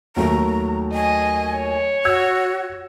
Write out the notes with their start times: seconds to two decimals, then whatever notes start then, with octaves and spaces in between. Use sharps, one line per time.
0.16 D#2 F#3 A3 A#5
0.94 D#5 G#5
1.57 C#5
2.05 F#4 E6 G#6